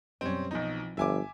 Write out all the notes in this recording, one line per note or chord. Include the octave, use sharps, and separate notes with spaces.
F#2 B2 G3 C4 C#4
B1 B2 E3 F3 C4 D#4
G1 F3 E5 G#5 D6